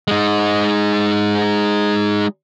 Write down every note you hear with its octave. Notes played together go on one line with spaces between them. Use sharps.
G#3 D#4